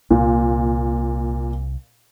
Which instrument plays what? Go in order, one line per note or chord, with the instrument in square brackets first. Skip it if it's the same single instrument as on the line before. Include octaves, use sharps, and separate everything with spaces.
[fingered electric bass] C2 [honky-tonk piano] A#2